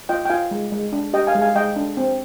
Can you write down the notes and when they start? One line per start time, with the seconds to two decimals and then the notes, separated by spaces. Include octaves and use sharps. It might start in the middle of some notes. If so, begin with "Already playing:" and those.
0.09 F4 D#5 G5
0.25 G5
0.29 F4 F5 G#5
0.51 G#3
0.72 G#3
0.92 D4
1.13 G4 D#5 G5
1.27 F5 G#5
1.35 G#3
1.42 F5 G#5
1.55 G#3 D#5 G5
1.76 D4
1.97 C4